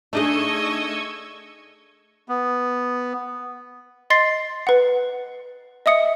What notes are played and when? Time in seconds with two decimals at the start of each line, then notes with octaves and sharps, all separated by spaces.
0.13 A3 D4 D#4 G#4 D#5 C#6 E6 G#6
2.29 B3
4.10 D#5 C6 A6 C7
4.67 B4 F#5
5.86 D#5 E5 D#6 C#7